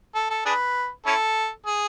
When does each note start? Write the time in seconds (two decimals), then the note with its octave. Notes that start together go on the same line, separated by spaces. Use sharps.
0.15 A4
0.30 A4
0.46 D4 G#4 B4
1.06 C#4 E4 A4
1.66 G#4